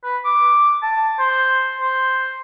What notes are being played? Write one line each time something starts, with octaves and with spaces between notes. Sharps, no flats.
B4
D6
A5
C5
C5